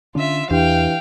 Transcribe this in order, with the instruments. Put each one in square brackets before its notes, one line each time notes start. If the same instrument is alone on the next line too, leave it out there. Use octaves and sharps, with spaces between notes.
[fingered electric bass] D3 C#4 D4 [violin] F4 E5
[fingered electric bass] E2 [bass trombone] E3 [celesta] D4 G4 [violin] F5 G5